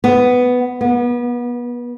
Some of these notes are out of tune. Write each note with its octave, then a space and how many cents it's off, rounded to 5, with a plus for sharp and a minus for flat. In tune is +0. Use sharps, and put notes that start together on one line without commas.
B3 +5
B3 -30